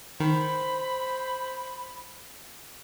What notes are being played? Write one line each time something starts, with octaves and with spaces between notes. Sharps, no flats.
D#3 C5 B5